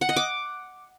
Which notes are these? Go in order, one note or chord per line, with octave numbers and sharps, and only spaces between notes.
F#5
D#5
D6